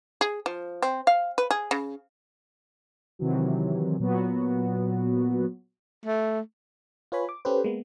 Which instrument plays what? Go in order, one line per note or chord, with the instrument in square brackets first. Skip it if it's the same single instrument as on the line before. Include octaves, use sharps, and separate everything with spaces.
[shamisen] G#4
F3
C4
F5
B4
G#4
C#3
[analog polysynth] C3 D#3 E3 F#3
A#2 F#3 B3 F#4
[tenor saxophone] A3
[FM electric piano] F4 B4 C#5 G#5 B5
D6
C#4 G4 A4 B4 C5
G#3 A#3 B3